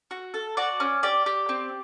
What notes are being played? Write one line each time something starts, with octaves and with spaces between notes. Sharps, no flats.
F#4
A4
F#4 D5
C#4
G4 D5
G4
C4